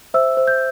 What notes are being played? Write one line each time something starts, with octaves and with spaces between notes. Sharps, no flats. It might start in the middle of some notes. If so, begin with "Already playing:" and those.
C5 E5 E6
C5
G6